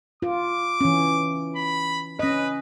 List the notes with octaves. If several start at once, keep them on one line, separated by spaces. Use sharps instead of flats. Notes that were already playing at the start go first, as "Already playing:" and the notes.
F4 D6
E3 C#4
B5
C#4 B4 D#5